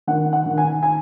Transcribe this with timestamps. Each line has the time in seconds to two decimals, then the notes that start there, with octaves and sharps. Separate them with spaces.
0.07 D#3 F#5
0.33 F#5
0.46 D#3
0.58 G#5
0.83 G#5